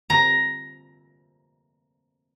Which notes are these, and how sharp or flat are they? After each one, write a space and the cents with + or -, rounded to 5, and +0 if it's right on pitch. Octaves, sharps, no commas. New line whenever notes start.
A#5 +10